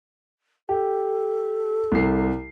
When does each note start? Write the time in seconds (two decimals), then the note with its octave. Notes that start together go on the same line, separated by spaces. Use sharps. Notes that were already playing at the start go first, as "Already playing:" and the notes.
0.69 G4 A4
1.92 C2 C3 C7